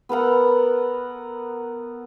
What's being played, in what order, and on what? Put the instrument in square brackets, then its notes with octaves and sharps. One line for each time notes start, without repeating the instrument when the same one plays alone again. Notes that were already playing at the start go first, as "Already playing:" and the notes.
[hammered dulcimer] B3 A4 A#4 F#5